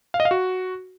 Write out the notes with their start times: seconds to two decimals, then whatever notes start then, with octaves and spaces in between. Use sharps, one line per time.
0.14 F5
0.20 D#5
0.25 F5
0.31 F#4